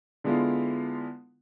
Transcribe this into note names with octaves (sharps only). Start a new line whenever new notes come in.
D3 G#3 B3 E4 F4